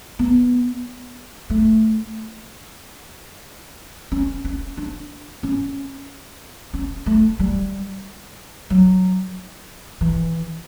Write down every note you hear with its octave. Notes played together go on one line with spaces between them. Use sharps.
B3
A3
C#4
C#4
D4
C#4
C#4
A3
G3
F#3
E3